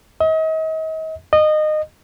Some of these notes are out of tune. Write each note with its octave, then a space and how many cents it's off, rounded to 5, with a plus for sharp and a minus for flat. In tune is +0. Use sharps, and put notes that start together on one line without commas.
D#5 +40
D#5 -20